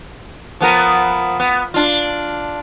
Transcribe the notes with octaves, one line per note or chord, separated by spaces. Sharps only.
F3 B3 A#4
B3
D4 F4